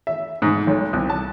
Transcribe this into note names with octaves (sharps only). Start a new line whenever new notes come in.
E5
G#2
B1
C2
A5